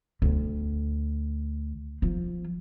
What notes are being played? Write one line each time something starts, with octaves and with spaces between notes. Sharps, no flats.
D2
F3